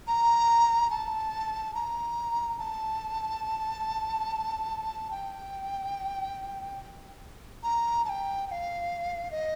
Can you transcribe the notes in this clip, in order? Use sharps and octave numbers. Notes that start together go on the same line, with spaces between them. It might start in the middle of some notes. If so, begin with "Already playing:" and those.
A#5
A5
A#5
A5
G5
A#5
A5
G5
G5
F5
D#5